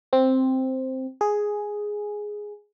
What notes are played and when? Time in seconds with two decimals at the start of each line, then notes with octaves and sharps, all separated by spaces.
0.13 C4
1.21 G#4